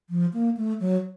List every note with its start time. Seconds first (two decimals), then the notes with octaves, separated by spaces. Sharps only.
0.10 F3
0.34 A#3
0.57 A3
0.80 F#3